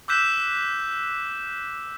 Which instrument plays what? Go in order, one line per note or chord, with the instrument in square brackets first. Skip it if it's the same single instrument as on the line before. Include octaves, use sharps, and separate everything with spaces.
[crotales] D6 E6 F#6 G6 B6 E7